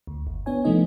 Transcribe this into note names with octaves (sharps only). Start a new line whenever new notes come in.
D2
G1
B3 D4 C#5 G#5
C3 F3 A3 B3 D#4 D#5